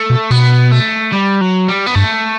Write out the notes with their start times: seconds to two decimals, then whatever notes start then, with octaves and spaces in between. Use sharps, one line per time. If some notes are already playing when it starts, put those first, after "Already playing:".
Already playing: A3
0.10 B2
0.30 B2 B3
0.72 A3
1.12 G3
1.41 F#3
1.68 G3
1.87 B3
1.95 G2 A3